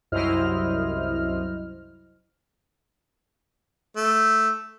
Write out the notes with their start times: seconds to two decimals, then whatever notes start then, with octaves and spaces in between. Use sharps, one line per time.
0.12 C2 F#2 E4 C5 D#5 F6
3.96 A3